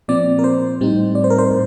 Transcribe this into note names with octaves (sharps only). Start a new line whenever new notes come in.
A#2 F3 C4 D5
A#4
C5
A2 G3 C4 D#4
D5
C5
A#4
C5
A2